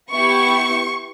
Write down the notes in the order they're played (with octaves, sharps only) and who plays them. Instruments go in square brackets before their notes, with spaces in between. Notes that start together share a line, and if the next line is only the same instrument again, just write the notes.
[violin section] B3 E4 G4 C#6